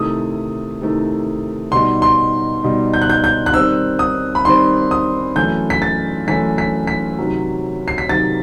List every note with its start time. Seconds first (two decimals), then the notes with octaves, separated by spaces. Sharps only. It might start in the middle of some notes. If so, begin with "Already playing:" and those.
Already playing: C3 D#3 A3 E4 D#6
0.81 C3 D#3 A3 E4
1.72 B2 G3 D#4 C6
2.02 C6
2.63 B2 G3 D#4
2.94 G6
3.02 F#6
3.10 G6
3.24 G6
3.46 F#6
3.54 D#3 G3 C4 E6
3.99 D#6
4.35 B5
4.45 D#3 G3 C4 C6
4.91 D#6
5.36 F#2 E3 A3 G6
5.70 B6
5.82 A6
6.27 F#2 E3 A3 B6
6.58 B6
6.87 B6
7.18 C3 D#3 F#3
7.88 C7
7.98 B6
8.09 C3 D#3 F#3 A6